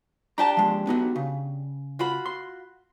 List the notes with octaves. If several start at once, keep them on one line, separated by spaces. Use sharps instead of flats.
D4 G4 A5 A#5
F3 G#3
B3 D#4 F#4
C#3
F4 F#4 B5
C6